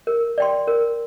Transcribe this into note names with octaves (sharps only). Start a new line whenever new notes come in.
A#4
D5 G5 C6
A#4